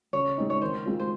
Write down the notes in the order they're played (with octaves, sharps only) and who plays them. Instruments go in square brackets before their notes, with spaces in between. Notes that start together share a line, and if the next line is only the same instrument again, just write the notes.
[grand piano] C#3 [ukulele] C#5
[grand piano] G#3 C4 D#4
[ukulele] C#5
[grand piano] D#3 [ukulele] C5
[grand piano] G#3 C4 F4
[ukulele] C5